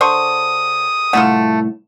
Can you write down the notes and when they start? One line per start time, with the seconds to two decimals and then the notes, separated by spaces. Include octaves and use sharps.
0.01 D3 C5 C#6 D#6
1.13 C2 A2 A3 E4 F4 F#5